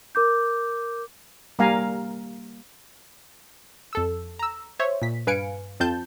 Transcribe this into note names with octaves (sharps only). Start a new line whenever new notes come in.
A#4 D6 G6
G3 A#3 A#4 F5 G#5 A#5
F2 A4 E6
A#5 E6
C5 C#5 E5
A#2 B6
G2 B4 F5 G#5 C#7 D7
F2 C4 F4 A5 G6